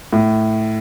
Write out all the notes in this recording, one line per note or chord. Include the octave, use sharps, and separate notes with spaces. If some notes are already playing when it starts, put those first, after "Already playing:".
A2